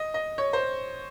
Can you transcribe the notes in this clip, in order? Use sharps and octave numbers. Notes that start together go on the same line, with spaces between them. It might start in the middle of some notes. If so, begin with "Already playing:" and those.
Already playing: D#5
D#5
C#5
C5